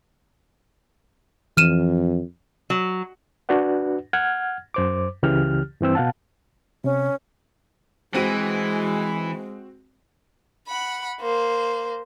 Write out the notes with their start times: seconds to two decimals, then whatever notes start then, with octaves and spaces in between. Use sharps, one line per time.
1.57 F2 E3 F6 D#7 E7
2.70 F#3
3.49 D4 F#4 B4 D5 F#5
4.13 F#5 F6 G#6
4.74 F#2 C5 D6
5.23 C#2 C#3 E3 G4 F6
5.81 G2 E3 C4 E6
5.95 B2 F5 F#5 A5
6.84 C3 C#4
8.14 E3 G#3 C4 F#4 D#7
10.68 F#5 B5
11.21 A#3 C5